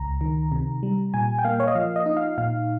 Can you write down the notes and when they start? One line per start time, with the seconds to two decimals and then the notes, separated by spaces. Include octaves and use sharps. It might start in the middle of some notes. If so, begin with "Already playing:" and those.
Already playing: C#2 A#5
0.21 D#3
0.52 C3
0.83 G3
1.14 A#2 G#5
1.39 G5
1.44 A#3 F5
1.60 C#5
1.67 D#5
1.75 F3 F5
1.96 D#5
2.06 D#4
2.17 F5
2.38 A#2 F5